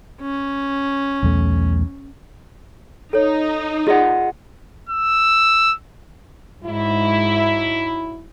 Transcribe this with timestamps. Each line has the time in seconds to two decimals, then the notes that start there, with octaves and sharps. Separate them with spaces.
0.21 C#4
1.23 B1 E2 A3
3.13 D#4 A4 C#5
3.87 F4 G#4 D5 D#5 F#5
4.90 E6
6.64 G#2 F#3 D#4 E4